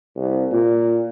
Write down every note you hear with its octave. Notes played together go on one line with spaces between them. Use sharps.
C2
A#2